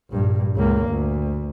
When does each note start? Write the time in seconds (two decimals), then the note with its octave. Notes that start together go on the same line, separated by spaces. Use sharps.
0.11 A#1 G2
0.55 C#2 A#3
0.89 D2